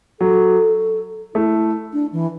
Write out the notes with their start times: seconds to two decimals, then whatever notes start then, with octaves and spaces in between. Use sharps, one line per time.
0.20 F#3 A4
1.35 A3 E4
1.93 D4
2.12 E3